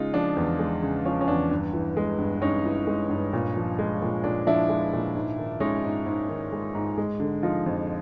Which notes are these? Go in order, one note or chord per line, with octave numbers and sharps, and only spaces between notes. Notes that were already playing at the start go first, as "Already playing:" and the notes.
Already playing: C#3 G#3 D#4 F4
F3 D4
E2
G#3
C#3
F3 C#4
C#4
E2 D4
G2
E3
G#3
G2
G2 C#4 D#4
E3
G#3
G2
A#2
F3
G#3
A#2
A#2 D4
F3 D4 E4
G#3
A#2
G#2
D#3
G#3 C#4 D#4
G#2
G#2
D#3
G#3
G#2
G#3
D3
F3 D#4 F4
F2